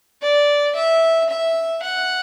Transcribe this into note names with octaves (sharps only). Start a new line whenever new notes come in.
D5
E5
E5
F#5